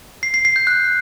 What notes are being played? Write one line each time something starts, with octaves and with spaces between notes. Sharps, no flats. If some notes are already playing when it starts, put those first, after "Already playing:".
C7
C7
C7
G6
F#6